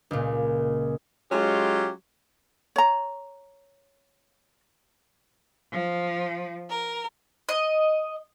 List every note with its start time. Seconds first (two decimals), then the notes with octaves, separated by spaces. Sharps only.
0.11 C#2 A#2
1.31 F#3 G#3 C#4 F4 G4
2.76 C#5 A#5
5.72 F3
6.69 A#4
7.49 D#5